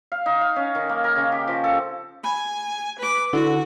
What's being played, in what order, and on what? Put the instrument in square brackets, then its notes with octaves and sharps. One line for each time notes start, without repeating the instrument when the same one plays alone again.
[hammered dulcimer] F5
D#4
F5
C#4
D#3
A#3
A#4
C#3
G4
F3
A4
[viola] G#5 [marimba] B5
[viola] B4 D6
[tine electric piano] D3 [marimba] E4 [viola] F#4